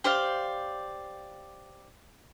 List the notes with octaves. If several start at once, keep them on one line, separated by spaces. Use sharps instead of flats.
G4 C5 D5 F5